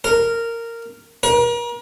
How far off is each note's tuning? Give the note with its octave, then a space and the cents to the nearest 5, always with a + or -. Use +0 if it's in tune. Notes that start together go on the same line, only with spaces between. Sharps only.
A#4 -10
A#4 +40